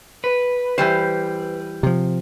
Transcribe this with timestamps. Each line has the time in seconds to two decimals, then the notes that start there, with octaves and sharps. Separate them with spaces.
0.24 B4
0.78 E3 G3 C5
1.83 C3 F3